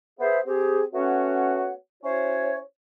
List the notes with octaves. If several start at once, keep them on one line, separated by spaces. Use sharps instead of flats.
B3 G#4 C5 E5
C4 G4 G#4
A3 B3 C#4 F#4 C#5 F#5
C#4 E4 F#4 C5 C#5